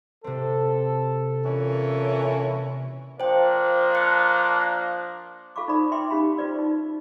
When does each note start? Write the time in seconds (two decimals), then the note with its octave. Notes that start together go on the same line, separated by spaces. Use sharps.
0.24 C3 C4 A4
1.46 A#2 E3 C#4
3.20 F3 A#3 D4 C5 G5
3.95 F#6 C#7
5.56 F4 A4 F5 B5 C#6 D6
5.68 D#4 C5 D5 B5 D#6
5.92 B4 E5 G5 C6 D6
6.10 C#4 D#4 G4 F5 B5
6.37 F4 B4 C5 D5 E6
6.59 D#4